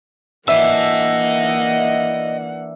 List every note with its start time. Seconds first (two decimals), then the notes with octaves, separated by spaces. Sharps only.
0.48 E3 A#3 D4 D#5 E5 F#5 A5 E6